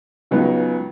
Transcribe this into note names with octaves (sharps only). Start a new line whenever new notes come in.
C#2 C#3 F#3 B3 D#4